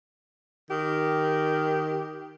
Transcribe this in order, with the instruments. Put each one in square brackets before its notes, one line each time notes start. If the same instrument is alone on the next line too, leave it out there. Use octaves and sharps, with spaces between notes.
[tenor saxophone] D#3 [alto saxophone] G4